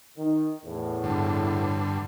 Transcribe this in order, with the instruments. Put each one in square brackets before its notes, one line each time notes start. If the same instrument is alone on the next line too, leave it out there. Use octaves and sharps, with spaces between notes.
[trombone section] D#3
E2 A2
[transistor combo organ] G2 D3